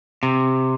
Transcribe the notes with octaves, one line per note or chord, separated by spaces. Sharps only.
C3